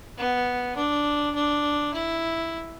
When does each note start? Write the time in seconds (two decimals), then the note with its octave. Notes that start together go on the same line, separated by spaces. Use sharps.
0.18 B3
0.77 D4
1.35 D4
1.94 E4